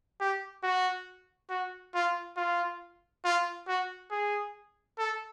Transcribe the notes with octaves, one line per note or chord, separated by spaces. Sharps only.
G4
F#4
F#4
F4
F4
F4
F#4
G#4
A4